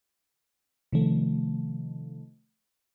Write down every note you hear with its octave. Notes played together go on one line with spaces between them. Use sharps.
C3 D#3 F3 A3